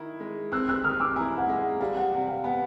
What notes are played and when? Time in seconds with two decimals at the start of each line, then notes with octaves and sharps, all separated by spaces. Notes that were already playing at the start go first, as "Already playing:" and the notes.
Already playing: D#3 E4
0.20 G#3
0.52 C4 E6 F#6
0.69 E6 F#6
0.84 D#3 D#6 F6
1.00 D6 E6
1.16 E4 G#5 A#5
1.38 F#5 G#5
1.49 G#3
1.59 F#5
1.80 G3 F5
1.97 F#5
2.12 C3 F#5
2.28 F5 G5
2.44 B3 F#5 G#5